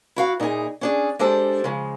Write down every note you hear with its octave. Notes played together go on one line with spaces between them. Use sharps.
E4 F#4 F5
A#2 D#4 E4 F#4 G#4
C#4 D4 G#4
G#3 D4 G4 A4 C5
C#3 F3 G#3